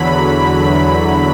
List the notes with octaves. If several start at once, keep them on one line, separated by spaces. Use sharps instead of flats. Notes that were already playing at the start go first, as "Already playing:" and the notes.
Already playing: E2 D3 F#3 B5